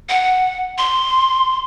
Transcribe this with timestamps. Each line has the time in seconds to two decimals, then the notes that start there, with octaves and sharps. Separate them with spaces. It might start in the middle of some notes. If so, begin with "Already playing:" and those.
0.09 F#5
0.78 C6